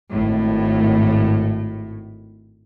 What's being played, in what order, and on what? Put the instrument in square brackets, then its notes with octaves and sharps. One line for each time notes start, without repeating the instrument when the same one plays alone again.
[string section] G#1 A2